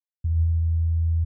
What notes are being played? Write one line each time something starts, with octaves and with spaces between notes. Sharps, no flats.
E2